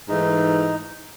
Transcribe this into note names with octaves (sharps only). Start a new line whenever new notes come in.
G#2 E3 A3 D#4